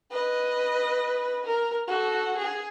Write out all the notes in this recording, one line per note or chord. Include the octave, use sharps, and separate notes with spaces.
B4 D#5
A#4
F#4 A4
G#4